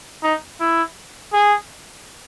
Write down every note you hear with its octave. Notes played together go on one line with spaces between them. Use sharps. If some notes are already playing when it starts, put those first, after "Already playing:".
D#4
E4
G#4